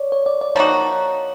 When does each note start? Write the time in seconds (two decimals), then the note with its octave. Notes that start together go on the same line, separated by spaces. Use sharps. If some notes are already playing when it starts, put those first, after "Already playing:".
Already playing: C#5 D5
0.12 C#5
0.26 D5
0.41 D5
0.55 F3 A#3 D#4 F#4 C#5